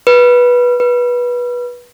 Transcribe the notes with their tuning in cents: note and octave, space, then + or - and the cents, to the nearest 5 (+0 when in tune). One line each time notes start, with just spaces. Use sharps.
B4 -15
B4 -20